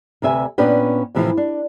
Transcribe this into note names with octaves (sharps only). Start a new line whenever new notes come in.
D2 C3 B4 E5 G#5
A#2 B3 C#4 D4 B4 G5
A2 C3 E3 F3
D4